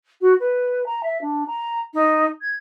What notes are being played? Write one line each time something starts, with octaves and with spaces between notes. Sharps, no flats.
F#4
B4
A#5
E5
D4
A#5
D#4
G#6